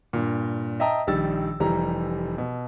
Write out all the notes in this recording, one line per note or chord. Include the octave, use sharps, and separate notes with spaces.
G2 A#2
D#5 E5 G5 A5 A#5 D#6
A#1 D#3 G3 E6 A6
F1 E3 G3 A#5
B2